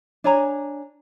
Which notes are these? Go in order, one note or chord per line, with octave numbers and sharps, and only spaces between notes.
D4 C#5 G#5 A#5